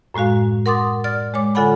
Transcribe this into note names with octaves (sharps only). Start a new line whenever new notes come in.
F#2 A2 G#3 F#4 F5
A#4 F#5 C6 D6 D#6 A6
D5 F6 A6
G#3 C#5 D6
D3 F4 A4 F#5 G#5 B5